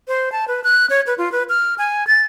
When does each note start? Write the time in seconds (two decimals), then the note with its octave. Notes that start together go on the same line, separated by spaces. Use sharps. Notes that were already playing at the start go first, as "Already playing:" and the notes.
0.08 C5
0.32 A5
0.48 B4
0.64 F#6
0.90 C#5
1.07 B4
1.18 F4
1.32 B4
1.49 F6
1.78 G#5
2.07 A6